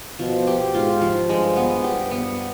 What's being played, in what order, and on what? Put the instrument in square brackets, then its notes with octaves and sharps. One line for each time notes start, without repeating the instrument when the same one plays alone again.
[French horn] B2 [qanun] F3
[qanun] G4
[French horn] G#2 [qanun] F4
[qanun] F3
[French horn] G2 [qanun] G#3
[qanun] B3
[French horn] G2 [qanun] G4
[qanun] B3